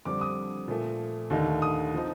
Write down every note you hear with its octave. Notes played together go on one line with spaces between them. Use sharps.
F2 D3 G3 C4 D6
D#6
A#2 F3 A3
D#2 D3 A3 D#4
D#6
F3 C4 D#4